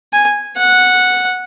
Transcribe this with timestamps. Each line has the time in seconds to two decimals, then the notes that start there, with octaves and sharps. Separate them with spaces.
0.13 G#5
0.58 F#5